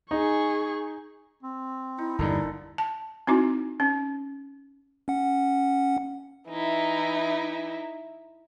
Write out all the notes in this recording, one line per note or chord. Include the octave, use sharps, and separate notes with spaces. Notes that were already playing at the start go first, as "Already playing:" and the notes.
D#4 G#4 C#6
C4
D#4 E4
G1 E2 G2 A#2 D3 D#4 A4
A5
C4 D#4 E4 F#4
C#4
C#4 F#5
E3 D#4 E4